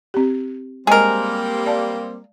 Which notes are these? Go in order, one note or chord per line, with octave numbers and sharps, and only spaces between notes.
C4 G4
G3 G#3 A#3 C4 G#4 A#4 D#5 G5
D5 F5 A5